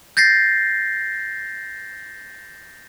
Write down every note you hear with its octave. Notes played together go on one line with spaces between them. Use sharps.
G6 A6 A#6 C7